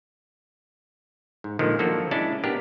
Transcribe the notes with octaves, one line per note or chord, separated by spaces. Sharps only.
G#2
A#2 D3 D#3 F3 G#3
F3 F#3 A#3 D4 F#4 A4
G#3 C#4 D4 E4 D5 A5
B3 D4 G4 A#4